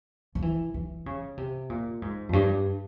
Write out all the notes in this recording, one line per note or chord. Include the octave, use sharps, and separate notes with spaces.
F3
E3
E3
C#3
C3
A#2
G#2
F2
G2